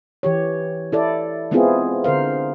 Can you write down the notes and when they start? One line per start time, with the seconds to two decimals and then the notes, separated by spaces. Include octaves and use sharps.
0.23 E3 G4 C#5
0.92 E4 A4 D5
1.51 G#3 B3 C4 E4 F4 G#4
2.04 D3 A#4 C5 F5